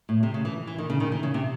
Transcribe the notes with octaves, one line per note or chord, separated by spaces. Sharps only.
A2
C3
C#3
E3
E3
D#3
C#3
D#3
E3
C#3
C3